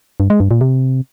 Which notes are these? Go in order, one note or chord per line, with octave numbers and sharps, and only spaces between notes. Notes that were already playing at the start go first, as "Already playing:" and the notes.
G2
G#3
G2
A#2
C3